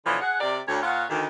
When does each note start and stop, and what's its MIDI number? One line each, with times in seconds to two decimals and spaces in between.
0.06 0.17 47
0.06 0.17 50
0.06 0.17 52
0.06 0.17 53
0.06 0.17 62
0.06 0.17 73
0.21 0.40 68
0.21 0.40 78
0.40 0.59 48
0.40 0.59 67
0.40 0.59 70
0.40 0.59 74
0.68 0.80 38
0.68 0.80 73
0.82 1.05 46
0.82 1.05 65
0.82 1.05 73
0.82 1.05 77
0.82 1.05 78
1.10 1.26 38
1.10 1.26 51